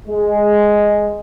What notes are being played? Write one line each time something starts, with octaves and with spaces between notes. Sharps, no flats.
G#3